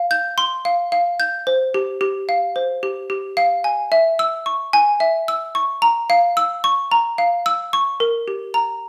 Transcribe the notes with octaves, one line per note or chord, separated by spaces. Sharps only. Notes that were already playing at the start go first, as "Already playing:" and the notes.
Already playing: F5
G6
C6
F5
F5
G6
C5
G4
G4
F5
C5
G4
G4
F5
G#5
E5
E6
C#6
G#5
E5
E6
C#6
A#5
F5
E6
C#6
A#5
F5
E6
C#6
A#4
G4
A#5